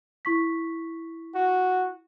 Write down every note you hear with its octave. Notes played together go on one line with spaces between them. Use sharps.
E4 C#6 B6
F#4